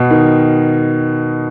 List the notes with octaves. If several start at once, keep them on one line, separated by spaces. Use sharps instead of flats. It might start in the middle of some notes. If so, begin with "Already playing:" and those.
Already playing: B2
D#3